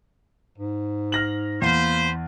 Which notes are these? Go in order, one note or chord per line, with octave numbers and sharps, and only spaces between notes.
G#2
F6 A#6 F#7
E2 A#3 B4 C5